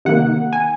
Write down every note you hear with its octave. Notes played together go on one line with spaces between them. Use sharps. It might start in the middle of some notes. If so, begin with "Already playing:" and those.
C3 D#3 A#3 F#5
G#5